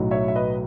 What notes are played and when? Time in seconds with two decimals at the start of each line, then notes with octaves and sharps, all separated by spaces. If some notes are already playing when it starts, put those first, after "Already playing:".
Already playing: B1 A2 F#3
0.11 C#5 E5
0.28 E5
0.36 B4 D#5